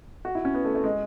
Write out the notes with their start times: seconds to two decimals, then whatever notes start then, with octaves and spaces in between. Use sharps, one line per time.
0.25 F#4
0.35 E4
0.45 C#4
0.54 B3
0.65 A3
0.75 A3
0.84 G#3